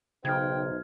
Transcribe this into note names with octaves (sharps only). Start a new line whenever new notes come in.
B1 C#3 D#4 C5 G5 F6 G#6